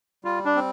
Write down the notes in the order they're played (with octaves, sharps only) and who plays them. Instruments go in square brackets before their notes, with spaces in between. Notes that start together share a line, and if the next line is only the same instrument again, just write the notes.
[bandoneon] G3 [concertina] F4
[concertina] D4
[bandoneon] C4